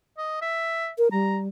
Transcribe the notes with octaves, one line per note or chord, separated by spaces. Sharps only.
D#5
E5
A#4
G3 A#5